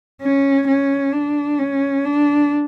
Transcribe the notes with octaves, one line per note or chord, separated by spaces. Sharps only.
C#4
C#4
D4
C#4
D4